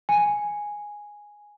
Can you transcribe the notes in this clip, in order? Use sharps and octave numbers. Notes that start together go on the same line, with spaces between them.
G#5